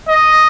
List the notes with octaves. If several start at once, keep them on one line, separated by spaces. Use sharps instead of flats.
D#5